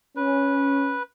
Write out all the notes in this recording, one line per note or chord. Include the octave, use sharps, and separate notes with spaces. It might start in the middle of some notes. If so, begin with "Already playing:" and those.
C#4 B4